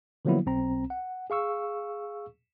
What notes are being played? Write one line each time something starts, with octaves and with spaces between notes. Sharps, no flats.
D3 F3 F#3 A#3 B3 E4
B1 C4 A#5
F#5
G#4 F5 C#6 E6